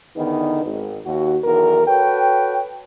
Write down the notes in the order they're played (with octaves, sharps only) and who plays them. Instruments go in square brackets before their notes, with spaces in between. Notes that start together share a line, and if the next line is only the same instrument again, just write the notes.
[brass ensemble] E2 D3 D#3 B3 D#4
G#1
D#2 F#4
B1 E2 D#3 F#4 A#4
F#4 A4 B4 C#5 G5